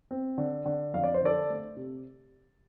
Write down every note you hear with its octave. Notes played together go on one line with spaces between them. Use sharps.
C4
D3
D3
F2 F5
D5
C5
D3 A4 D5
A3
C3